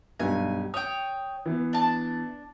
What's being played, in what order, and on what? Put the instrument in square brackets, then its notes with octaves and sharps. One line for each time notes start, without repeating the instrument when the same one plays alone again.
[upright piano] B1 G2 G3 [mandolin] G#5
[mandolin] C#5 G5 [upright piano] D#6
[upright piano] E3 B3
[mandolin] D4 A5